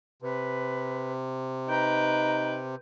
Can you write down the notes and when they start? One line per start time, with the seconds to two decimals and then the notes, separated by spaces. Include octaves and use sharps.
0.22 C3 B4
1.69 D#4 B4 G5 A#5